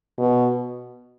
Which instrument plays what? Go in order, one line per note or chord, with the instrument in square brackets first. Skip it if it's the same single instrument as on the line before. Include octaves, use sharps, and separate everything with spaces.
[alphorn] B2